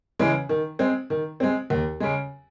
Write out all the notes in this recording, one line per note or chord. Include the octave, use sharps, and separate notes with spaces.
C#3 E3 G#3
D#3
G#3 C4
D#3
G#3 C4
D#2
C#3 G#3